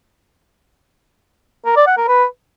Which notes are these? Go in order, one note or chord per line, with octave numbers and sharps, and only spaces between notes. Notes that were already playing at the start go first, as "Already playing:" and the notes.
A#4
D5
F#5
A#4
B4